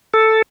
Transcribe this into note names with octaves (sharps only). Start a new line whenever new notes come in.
A4